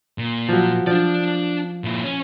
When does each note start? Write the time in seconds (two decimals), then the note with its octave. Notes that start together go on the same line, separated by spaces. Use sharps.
0.18 A#2
0.49 F3 F#3
0.87 F3 D4 D5
1.84 A#2 E4
2.04 C#4